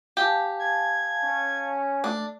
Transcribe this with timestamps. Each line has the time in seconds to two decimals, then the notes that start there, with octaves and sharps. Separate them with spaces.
0.17 G4 F5 G#5 A5
0.59 G#6
1.24 C#4
2.04 A3 D4